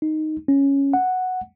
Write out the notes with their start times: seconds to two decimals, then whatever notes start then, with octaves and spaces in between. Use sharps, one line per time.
0.02 D#4
0.48 C#4
0.93 F#5